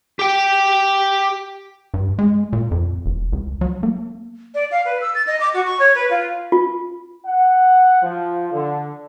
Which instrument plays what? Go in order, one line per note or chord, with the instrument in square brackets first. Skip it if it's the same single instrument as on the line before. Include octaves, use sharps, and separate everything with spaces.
[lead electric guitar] G4 G5
[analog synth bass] G2
G#3
A#2
F2
E1
C#2
F#3
A#3
[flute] D5
F5
B4
E6
A6
D#5
D6
F#4
C#6
C#5
B4
F4
[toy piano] F4
[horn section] F#5
F3
D3